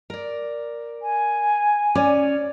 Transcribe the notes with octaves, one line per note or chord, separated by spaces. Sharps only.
A#4 D5
G#5
C#4 D5